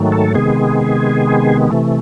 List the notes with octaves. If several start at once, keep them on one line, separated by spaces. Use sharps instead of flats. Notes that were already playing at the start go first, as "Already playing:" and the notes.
Already playing: G#2 D#3 F#3 A3
A4
C3 D#3 G#3 B3 G#4
C3 E3 A3